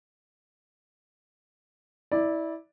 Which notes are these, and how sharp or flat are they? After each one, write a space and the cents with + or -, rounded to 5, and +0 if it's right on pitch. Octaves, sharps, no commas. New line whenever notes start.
E4 -20 D5 +0